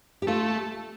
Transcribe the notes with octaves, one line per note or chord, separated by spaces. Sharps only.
G4
A3 F4